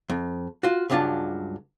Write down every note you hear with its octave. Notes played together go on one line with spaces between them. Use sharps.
F2
F4 F#4
C#2 G2 F#3 D4 F4 A5